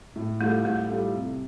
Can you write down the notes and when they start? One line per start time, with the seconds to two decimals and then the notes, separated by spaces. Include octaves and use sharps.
0.16 A2
0.41 G3 A3 F4 A4
0.64 A2 A3
0.89 G3 F4 A4
1.13 C3